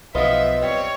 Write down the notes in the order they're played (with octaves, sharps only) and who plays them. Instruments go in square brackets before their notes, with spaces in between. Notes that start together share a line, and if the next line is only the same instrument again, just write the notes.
[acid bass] B1 [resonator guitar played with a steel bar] F3 B3 F4 [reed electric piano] B4 D#5 [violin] E5
[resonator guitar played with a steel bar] G3 C4 [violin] C#5